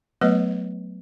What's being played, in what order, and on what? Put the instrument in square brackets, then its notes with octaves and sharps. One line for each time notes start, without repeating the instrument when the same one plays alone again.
[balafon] F#3 A3 B3 B4 D#5